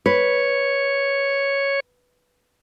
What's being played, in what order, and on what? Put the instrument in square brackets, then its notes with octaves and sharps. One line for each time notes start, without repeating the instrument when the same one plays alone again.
[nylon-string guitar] B4 [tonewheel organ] C#5